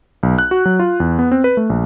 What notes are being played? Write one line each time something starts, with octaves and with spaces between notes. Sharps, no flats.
B1
F#6
F#4
F#3
F4
E2
B3
C4
B4
A3
A#1